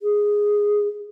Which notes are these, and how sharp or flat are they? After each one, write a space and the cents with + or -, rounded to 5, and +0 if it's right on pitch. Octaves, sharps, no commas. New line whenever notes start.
G#4 -5